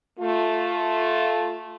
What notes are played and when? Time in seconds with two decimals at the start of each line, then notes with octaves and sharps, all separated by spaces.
0.19 A3 F4